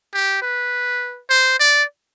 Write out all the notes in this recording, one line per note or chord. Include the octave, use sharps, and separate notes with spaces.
G4
B4
C5
D5